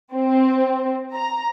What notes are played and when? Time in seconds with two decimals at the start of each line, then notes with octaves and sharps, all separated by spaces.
0.13 C4
1.14 A#5